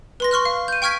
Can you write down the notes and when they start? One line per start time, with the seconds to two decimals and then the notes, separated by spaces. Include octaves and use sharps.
0.20 B4 C6 A#6
0.31 C6 C#6 F6 F#6
0.45 F5
0.68 G6 D#7
0.82 G5 C#6 F6 G#6 B6 D7